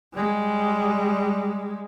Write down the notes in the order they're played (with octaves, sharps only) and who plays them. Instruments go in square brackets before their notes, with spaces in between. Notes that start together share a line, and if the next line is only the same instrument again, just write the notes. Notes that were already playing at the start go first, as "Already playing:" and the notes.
[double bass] G3 G#3